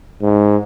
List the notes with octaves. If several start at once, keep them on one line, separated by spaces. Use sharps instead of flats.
G#2